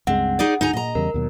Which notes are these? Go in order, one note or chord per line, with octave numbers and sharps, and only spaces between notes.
C#2 G2 G#3 C4 F#5
D#4 G#4 D5
D2 D#4 G#5 A#5
A#2 D#5 A#5
E2 C#3 G3 A#4
D#2 B2 F#3